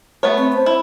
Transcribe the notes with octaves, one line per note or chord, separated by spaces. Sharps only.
A3 B3 C#5
C4
C5
E4